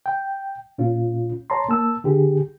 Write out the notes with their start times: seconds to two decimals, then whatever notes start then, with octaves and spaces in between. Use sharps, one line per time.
0.06 G5
0.78 A#2 C#4 F4
1.50 C#5 A5 A#5 C6
1.69 A#3 A5 E6
2.04 D3 G4 G#4